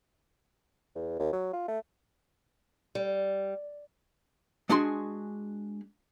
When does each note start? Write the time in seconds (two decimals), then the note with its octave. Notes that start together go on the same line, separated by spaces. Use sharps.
0.95 E2
1.19 D#2
1.33 F#3
1.53 F4
1.68 A3
2.95 G3
4.69 G#3 D4 F#4 G#4 C6